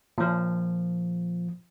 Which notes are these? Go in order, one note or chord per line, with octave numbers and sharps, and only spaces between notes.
A#2 F3